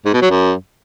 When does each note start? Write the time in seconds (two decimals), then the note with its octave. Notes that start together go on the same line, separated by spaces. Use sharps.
0.05 G#2
0.14 B2
0.22 F#3
0.30 F#2